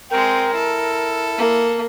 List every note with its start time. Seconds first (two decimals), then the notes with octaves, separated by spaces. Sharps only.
0.11 G#3 C4 A#4 G5
0.54 E4 A4
1.38 A#3